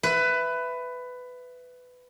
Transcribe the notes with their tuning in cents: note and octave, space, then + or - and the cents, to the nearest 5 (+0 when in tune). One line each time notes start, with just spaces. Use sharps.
B4 +15 E5 +10